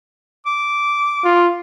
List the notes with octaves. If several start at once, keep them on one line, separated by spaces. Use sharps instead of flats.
D6
F4